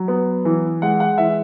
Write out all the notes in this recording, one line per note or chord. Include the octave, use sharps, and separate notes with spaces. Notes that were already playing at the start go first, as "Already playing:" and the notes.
Already playing: F#3
B3
E3
G#3 F#5
F#5
E3 E5